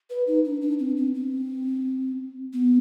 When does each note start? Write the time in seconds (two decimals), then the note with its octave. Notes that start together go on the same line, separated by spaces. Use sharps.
0.10 B4
0.27 D#4
0.45 D4
0.61 D4
0.79 C4
0.97 C4
1.14 C4
2.53 B3